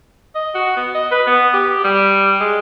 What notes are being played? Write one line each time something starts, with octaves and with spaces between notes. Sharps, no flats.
D#5
F#4
B3
D#5
B4
B3
G4
G3
G#3